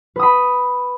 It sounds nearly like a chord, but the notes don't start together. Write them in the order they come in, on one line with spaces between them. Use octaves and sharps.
B4 D#6 B5